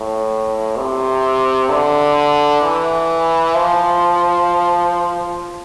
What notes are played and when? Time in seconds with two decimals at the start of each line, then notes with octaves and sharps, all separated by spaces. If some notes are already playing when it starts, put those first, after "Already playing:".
Already playing: A2
0.78 C3
1.69 D3
2.62 E3
3.55 F3